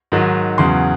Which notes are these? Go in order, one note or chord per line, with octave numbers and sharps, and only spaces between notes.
G#2 D#3 F#3
E2 C#3 F#3 C6